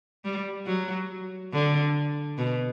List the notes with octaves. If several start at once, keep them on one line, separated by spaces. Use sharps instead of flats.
G3
F#3
D3
B2